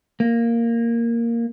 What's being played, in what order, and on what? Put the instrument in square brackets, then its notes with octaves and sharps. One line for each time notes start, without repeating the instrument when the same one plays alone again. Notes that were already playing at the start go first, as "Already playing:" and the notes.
[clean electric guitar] A#3